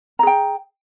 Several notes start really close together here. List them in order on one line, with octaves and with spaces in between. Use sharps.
A#5 G#4 G5